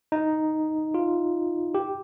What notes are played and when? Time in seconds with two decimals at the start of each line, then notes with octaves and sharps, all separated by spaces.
0.12 D#4
0.94 F4
1.75 G4